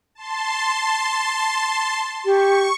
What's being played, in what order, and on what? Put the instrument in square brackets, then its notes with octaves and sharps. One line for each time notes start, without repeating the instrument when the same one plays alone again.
[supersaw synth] A5 C6
[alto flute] G4 [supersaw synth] C#6